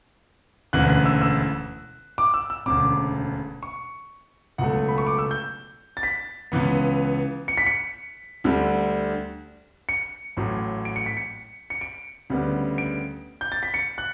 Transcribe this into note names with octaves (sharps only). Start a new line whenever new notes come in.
E1 D2 C#3 E3 F#6
F#6
E6
E6
D6
E6
E6
E1 D2 C#3 D6
C#6
C#2 B2 F#3 A3 F#5
B5
C#6
D6
E6
G6
A6
B6
C#2 C#3 E3 B3
C#7
B6
C#7
D2 D3 G3
C#7
A1 A2 F#3
D7
C#7
B6
C#7
C#7
D7
D2 C#3 G3 B3
D7
G6
A6
B6
C#7
F#6